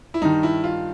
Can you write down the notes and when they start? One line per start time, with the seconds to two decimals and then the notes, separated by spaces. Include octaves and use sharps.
0.14 E4
0.22 G2 D#3 D#4
0.43 E4
0.64 F4